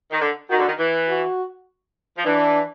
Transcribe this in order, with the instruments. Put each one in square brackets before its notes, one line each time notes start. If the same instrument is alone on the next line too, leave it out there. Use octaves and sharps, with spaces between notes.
[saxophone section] D#3
D3
[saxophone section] D#3 [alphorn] F#4
[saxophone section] D3
D#3
E3
[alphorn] F#4
[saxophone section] F3
[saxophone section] E3 [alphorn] D4